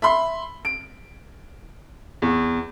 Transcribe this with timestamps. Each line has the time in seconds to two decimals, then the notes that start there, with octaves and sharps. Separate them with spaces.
0.02 E5 B5 C6
0.65 D7
2.22 E2